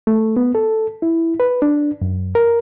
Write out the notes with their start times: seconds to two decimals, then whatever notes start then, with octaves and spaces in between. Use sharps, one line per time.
0.07 A3
0.37 B3
0.55 A4
1.02 E4
1.40 B4
1.62 D4
2.02 F#2
2.35 A#4